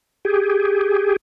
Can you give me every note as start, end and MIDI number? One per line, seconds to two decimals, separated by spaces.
0.25 1.16 67
0.25 1.16 68